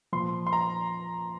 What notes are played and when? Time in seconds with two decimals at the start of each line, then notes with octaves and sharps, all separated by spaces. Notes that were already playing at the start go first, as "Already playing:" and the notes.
0.13 A#2 F3 C6
0.47 C6
0.53 A#5